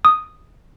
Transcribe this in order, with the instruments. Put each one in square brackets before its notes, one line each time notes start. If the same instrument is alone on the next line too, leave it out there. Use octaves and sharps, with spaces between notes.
[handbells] D#6